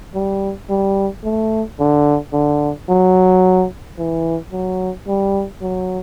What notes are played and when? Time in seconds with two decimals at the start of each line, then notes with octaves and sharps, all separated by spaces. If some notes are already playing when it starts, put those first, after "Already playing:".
0.15 G3
0.70 G3
1.24 A3
1.80 D3
2.33 D3
2.89 F#3
3.98 E3
4.52 F#3
5.07 G3
5.61 F#3